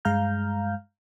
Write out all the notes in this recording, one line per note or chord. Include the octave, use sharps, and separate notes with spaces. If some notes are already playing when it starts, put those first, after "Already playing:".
G2 G#3 F5 A#5 F6 G6